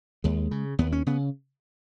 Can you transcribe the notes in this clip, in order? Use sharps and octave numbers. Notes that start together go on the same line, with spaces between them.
D#2 G#3
C#3
D#2 B3
C#4
C#3 B3